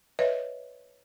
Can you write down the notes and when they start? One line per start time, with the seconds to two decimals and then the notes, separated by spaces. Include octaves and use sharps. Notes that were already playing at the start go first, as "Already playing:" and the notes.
0.19 B4 C#5 D#5 E5